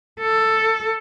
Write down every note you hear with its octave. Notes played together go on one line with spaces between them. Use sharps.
A4